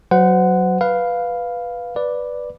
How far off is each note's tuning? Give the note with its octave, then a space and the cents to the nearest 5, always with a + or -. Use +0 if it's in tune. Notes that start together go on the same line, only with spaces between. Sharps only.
F#3 +0 C5 -35 F#5 +0
B4 +0 F5 +0
B4 +0 D5 +0